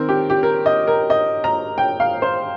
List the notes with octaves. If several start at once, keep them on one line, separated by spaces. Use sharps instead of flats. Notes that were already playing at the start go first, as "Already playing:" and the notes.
Already playing: D#3 C4 A#4
G4
G4
A#4
D#5
A#4
D#5
A#5
G5
F5
C5